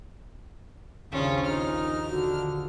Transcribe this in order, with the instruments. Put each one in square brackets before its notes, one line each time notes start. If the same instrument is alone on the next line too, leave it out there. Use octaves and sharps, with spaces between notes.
[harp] A#1 D#2 A#2 [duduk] C#3 [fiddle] C#4 F4
[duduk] D#4 [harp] F4 [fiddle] F6
[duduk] D3 [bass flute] F#4